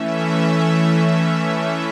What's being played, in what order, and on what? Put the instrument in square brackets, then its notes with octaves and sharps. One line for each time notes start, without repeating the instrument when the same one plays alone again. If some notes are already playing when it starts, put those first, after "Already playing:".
Already playing: [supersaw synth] E3 A3 C#4 E5